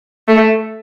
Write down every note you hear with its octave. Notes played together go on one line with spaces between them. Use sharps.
A3